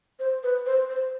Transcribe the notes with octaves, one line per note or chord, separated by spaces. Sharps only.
C5
B4
C5
C5